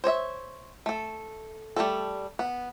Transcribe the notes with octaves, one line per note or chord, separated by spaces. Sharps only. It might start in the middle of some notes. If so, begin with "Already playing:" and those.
C5 C#5 D#5 E5
A3 A4
G3 A3 C#4 A4
B3